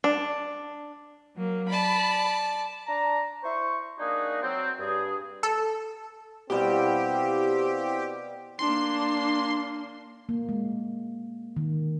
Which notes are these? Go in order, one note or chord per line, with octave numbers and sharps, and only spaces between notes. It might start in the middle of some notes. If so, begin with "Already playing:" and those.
D4
F#3 A#3
D5 A5 B5
D4 A5 A#5
E4 C5 C#6
A#3 D4 D#4 F#4 G#4
F#3 C4
G2 G#4
A4
B2 G3 C4 E4 F#4 G4 F5 G5
A#3 D4 C6
A#3
G#3
D#3